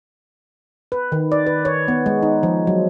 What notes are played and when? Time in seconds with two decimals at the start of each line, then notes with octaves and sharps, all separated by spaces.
0.92 B4
1.12 D#3
1.32 D5
1.47 B4
1.65 C#5
1.88 B3
2.06 G#3
2.22 D#4
2.43 F3
2.67 F#3